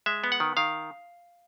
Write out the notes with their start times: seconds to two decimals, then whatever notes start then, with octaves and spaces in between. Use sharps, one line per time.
0.06 G#3 E5
0.24 B3
0.32 F#5
0.40 D#3
0.57 D#3 F5